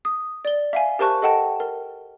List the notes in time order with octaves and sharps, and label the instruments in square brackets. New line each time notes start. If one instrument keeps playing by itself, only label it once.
[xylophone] D#6
D5 G7
E5 F5 G#5
G4 A#4 C5 A5 C#6 F#6
A4 D#5 F#5 G5 A5
A#4